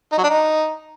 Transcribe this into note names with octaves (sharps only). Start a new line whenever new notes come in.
D#4
F#3
D4
D#4